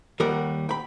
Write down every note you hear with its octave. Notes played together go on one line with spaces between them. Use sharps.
D#2 G3 A#4 F#5
G5 B5